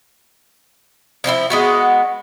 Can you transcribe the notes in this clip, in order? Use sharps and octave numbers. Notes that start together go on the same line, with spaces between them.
F3 C4 D4 E4
G#3 B3 F#4